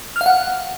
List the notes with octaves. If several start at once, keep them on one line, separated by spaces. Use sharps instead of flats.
F6
F5
F#5